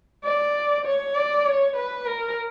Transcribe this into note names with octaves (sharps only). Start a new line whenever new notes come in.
D5
C#5
D5
C#5
B4
A#4